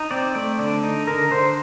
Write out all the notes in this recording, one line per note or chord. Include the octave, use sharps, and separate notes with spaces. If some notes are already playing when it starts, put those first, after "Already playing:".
Already playing: D#4
C4 D5
A3 D5
D3 D5
D#4
D3 A#4
D3 C5